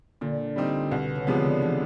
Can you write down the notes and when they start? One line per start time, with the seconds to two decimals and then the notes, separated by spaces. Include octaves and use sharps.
0.21 A#2 D3
0.56 G3 C4 D#4
0.91 C2 B2
1.15 C#3
1.27 C3 F3 G#3 B3
1.38 D3
1.62 E3